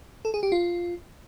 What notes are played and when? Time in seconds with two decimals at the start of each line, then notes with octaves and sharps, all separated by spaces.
0.25 A4
0.34 G#4
0.43 G4
0.52 F4